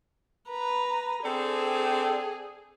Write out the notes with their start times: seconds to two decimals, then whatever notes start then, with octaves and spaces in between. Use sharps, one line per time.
0.50 B4 A#5
1.24 C4 D4 G#4 A4